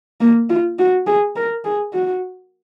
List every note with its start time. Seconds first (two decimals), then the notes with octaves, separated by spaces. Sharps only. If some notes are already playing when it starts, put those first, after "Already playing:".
0.21 A#3
0.50 F4
0.79 F#4
1.07 G#4
1.36 A#4
1.64 G#4
1.93 F#4